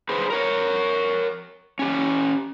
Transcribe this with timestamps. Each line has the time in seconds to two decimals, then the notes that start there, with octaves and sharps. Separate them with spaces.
0.09 G#4 B4 C5
0.30 A#4 C#5
1.79 C#4 G4